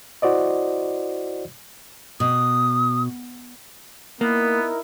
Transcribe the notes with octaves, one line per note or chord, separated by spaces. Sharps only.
E4 F#4 C5 D5 D#5
B2 D#6
A#3 B3 D#4 E4 A#4